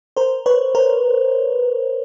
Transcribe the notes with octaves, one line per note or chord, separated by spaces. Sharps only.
A#4 C5
B4 C#5
A#4 C5